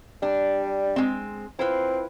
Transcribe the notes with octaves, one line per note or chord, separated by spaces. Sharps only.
G3 D4
G#3 C4
C4 E4 F4 B4